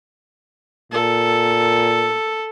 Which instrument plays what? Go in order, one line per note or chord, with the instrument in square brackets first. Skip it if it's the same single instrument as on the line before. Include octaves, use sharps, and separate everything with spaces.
[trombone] A#2 [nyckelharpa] A4